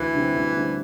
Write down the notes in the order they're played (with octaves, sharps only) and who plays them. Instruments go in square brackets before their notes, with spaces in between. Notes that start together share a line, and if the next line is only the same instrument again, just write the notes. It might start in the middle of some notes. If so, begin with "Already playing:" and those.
Already playing: [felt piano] D2 [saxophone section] E3
[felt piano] D3 G3 C4
D2
D3 G3 C4